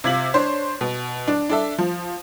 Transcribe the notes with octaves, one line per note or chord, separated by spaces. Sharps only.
C3 F4 G#6 B6 F#7
D4 C5 C#5
B2
D4
D4 A4 E5
F3